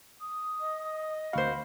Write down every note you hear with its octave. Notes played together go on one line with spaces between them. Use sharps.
D#6
D#5
D2 F#4 C5 F5 B5